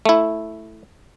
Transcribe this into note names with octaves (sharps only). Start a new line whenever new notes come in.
A3 E4